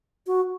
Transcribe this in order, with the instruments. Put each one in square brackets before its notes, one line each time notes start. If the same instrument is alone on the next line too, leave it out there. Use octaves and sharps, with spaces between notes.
[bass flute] F#4